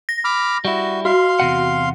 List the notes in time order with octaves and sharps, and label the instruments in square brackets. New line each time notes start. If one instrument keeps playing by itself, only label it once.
[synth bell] A#6
[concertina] B5 D6 F6
[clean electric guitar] G3 E4 [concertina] F#4
[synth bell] F#4 [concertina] F5 C6
[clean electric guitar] E2 C3 F#5